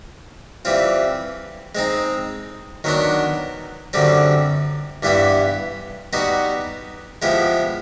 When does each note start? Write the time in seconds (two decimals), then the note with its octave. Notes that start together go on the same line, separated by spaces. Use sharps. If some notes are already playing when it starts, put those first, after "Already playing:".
0.65 E3 G3 C4 F4
1.75 G#3 C4 D#4
2.84 D#3 F#3 B3 D4
3.93 F#2 D3 G3 C4
5.03 G2 E3 G3 B3 E4
6.13 G3 B3 D#4 F#4
7.22 F3 G#3 B3 E4 G4